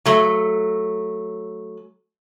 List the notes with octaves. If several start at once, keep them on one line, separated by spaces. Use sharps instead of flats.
F#3 A3